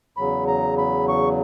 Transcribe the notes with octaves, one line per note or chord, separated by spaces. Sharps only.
E2 C#3 F#3 B5
A#5
B5
C#6